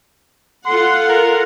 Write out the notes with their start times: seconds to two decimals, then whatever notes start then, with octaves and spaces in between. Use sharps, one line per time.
0.66 F4 A4 F#5 C6
1.09 A#4